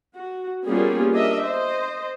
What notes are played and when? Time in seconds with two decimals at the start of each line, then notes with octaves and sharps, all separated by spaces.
0.14 F#4
0.67 G3 A#3 B3 C#4 F4 G#4
1.12 D4 A#4 D#5 E5
1.44 C5 D#5